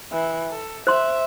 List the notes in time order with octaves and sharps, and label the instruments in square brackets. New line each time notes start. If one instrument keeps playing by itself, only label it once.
[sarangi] E3
A4
[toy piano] C5 C6 [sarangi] E5